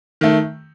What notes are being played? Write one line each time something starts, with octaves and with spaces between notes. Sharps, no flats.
D#3 A3